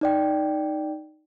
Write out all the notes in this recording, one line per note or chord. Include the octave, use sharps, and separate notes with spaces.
D#4 D5 G5